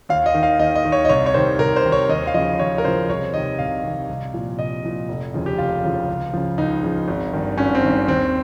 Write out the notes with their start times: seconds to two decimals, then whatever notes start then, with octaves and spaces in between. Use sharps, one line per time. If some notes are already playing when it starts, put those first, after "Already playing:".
0.09 D#2 F5
0.26 D#5
0.35 D#3
0.43 F5
0.59 D#2 D#5
0.76 D#5
0.85 D#3
0.92 C#5
1.05 D#5
1.09 C2 C#5
1.26 C#5
1.34 C3 D#3 C5
1.59 C2 A#4
1.76 C5
1.84 C3 D#3
1.92 C#5
2.09 D#2 D#5
2.27 F5
2.34 C#3 F3 D#5
2.59 D#2 C#5
2.78 A#4
2.84 C#3 F3 C5
3.09 C2 C#5
3.34 C3 D#3 D#5
3.59 C2 F5
3.84 C3 D#3
4.09 C2
4.33 A#2 F3
4.59 C2 D#5
4.84 A#2 F3
5.09 F1
5.34 D#2 C#3 F3
5.46 G4
5.58 F1 F4
5.83 D#2 C#3 F3
6.08 C#2
6.33 C#3 F3
6.58 C#2 D#4
6.83 C#3 F3
7.08 G#1
7.33 G2 D#3
7.58 G#1 C#4
7.75 C4
7.83 G2 D#3
8.08 D#2 C4